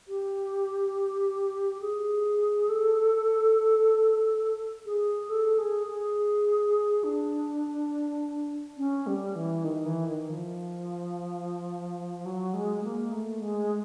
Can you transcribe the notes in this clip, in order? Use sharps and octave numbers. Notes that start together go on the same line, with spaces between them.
G4
G#4
A4
G#4
A4
G#4
G#4
D4
C#4
G3
E3
D#3
E3
D#3
F3
F#3
G#3
A#3
A3
G#3